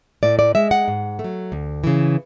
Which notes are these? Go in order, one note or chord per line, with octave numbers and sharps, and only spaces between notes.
A2 D5
D5
G#3 E5
F#5
G#2
A3
F#3
D2
C#3 E3